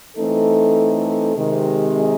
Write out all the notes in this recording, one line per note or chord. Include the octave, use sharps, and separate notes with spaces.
E3 A3 C4 D#4 A4
C3 D#3 G#3